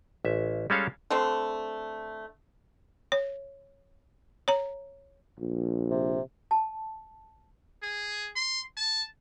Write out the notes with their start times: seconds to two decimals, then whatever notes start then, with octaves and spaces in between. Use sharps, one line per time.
0.25 A1 E5
0.70 G3 G#3 C#4 A4 C#5 F5
1.10 D3 A3 C4
3.12 C#5
4.48 C#5 A#5
5.39 A#1
5.90 C3
6.51 A5
7.83 G#4
8.36 C6
8.77 A5